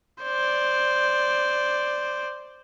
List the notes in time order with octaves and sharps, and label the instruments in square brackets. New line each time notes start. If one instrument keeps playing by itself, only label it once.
[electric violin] C5 D5